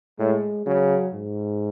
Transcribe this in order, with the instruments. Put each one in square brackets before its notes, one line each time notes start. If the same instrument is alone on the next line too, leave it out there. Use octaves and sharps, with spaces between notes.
[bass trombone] A2 [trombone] G#3
[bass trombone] C#3 [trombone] F#3
[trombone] G#2